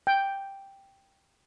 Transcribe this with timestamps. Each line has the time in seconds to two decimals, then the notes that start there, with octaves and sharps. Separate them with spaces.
0.07 G5